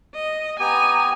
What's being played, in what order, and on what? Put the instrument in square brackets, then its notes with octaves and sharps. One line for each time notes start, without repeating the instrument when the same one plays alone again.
[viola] D#5
[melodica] B3 G4 [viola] G#5 A#5 [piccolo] D#7